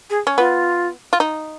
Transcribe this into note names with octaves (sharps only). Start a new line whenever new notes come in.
G#4
C#4
B3 F4
F4
D#4